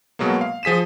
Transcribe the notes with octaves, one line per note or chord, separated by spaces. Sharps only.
B2 F#3 G#3 A#3
F5
F3 G#4 B6 D#7 E7